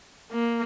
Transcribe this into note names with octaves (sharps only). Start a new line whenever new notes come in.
A#3